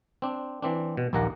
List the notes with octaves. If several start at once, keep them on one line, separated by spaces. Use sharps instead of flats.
C4 D4
E3 C4 D4
B2
A#1 D#2 A#3 D#5 F#5 A#5